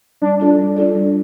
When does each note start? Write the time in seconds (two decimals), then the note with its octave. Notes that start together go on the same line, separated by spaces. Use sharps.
0.21 G3 D4
0.40 D4 F4 A4 D5
0.59 G3
0.77 D4 F4 A4 D5
0.95 G3